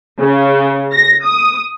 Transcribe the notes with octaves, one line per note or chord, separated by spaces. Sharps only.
C#3
A#6
D#6